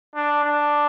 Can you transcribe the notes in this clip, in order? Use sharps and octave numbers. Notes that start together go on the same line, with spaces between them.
D4
D4